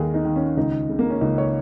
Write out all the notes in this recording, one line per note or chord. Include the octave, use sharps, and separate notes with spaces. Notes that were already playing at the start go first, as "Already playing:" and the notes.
Already playing: D#2 D#3 G#4 A#4
D#4
D#3
C#4
C#2 D#4
C#3
A#3
C#4
C#2 D#4
C#5